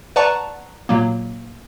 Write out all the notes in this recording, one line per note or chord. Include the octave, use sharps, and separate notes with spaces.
B4 D5 F#5 A5 A#5 C#6
A#2 F#3 A#3